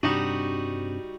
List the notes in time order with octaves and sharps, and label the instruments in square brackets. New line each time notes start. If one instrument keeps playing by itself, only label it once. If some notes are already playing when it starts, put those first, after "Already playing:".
[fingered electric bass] G2 C3 D4 [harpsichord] G3 D#4 F#4